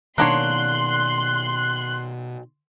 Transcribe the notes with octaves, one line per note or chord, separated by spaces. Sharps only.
B2 D#3 A#3 D4 C#5 C6 F#6